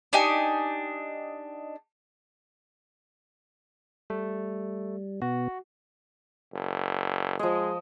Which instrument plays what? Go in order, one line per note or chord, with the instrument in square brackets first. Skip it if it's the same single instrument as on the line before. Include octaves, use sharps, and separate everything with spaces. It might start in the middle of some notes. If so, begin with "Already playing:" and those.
[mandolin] D4 D#4 G4 G#5
[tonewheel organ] G3 [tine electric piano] A3
[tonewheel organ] B2 B3 [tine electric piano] F#4
[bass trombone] F#1
[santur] F3 D#5 [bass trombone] G#3